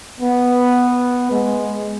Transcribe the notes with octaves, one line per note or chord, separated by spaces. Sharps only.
B3
G#3